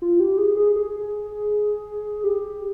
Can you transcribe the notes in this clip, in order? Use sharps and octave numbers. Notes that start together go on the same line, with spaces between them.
F4
G4
G#4
G#4
G#4
G4